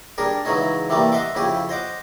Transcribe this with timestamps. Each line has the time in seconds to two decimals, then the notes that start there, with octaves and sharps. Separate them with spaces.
0.18 G3 D4 G#4 A#4
0.45 C#3 E3 F#3 G#3 C#4 D#4
0.89 C3 E3 G3 A3 A#3
1.12 D#5 E5 F#5 C6 D6
1.35 F2 C#3 E4 G4 G#4
1.69 C5 D#5 F#5 D6